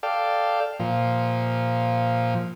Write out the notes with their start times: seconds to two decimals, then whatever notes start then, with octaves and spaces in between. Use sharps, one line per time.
0.03 A4 D5 F5 G5
0.80 A#2 F3